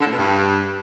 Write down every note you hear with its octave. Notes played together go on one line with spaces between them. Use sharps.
D3
A2
B2
G2